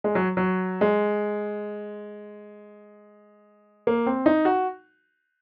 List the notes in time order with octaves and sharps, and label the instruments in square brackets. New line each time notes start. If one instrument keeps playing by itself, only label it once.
[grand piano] G#3
F#3
F#3
G#3
A#3
C4
D#4
F#4